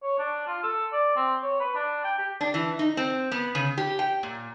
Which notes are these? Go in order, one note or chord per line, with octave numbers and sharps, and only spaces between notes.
C#5
D4
F4
A4
D5
C4
C#5
B4
D4
G5
G4
D4
E3
D#4
C4
B3
C#3
G4
G5
A#2